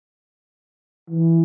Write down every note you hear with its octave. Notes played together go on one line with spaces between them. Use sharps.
E3